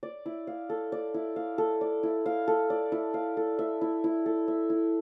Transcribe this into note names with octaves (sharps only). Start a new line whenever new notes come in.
D5
E4
F5
A4
D5
E4
F5
A4
D5
E4
F5
A4
D5
E4
F5
A4
E5
E4
E4
A4
E5
E4